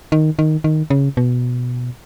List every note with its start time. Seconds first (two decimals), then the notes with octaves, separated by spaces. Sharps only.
0.12 D#3
0.39 D#3
0.64 D#3
0.90 C#3
1.17 B2